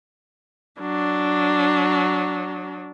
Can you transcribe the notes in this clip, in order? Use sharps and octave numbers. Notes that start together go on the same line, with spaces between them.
F#3 D4